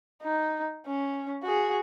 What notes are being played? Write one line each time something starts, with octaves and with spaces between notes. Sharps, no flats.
D#4
C#4
F#4 G#4